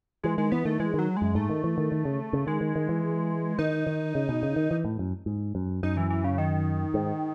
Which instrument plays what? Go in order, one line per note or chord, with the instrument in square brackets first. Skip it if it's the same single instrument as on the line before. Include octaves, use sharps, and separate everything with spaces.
[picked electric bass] E3 [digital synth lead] G#3
[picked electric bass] D#3 [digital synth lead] G#3
[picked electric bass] E3 [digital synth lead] B3
[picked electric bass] D#3 [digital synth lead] A3
[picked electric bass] E3 [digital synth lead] G#3
[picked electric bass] D#3 [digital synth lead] F#3
[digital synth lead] G#3
[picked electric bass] F#2
[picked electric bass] G#2 [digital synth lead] A3
[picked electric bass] D#3
E3
D#3
D#3
C#3
C#3
[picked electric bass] D#3 [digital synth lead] G#3
[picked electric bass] D#3
D#3
E3
[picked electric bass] D#3 [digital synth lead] D#4
[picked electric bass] D#3
C#3
B2
C#3
D#3
E3
A2
F#2
G#2
F#2
[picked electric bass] F#2 [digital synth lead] D#4
[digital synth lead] E3
E3
C#3
D#3
[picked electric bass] G#2